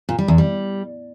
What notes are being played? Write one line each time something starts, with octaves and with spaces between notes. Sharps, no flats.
A#2
G3
E2
G3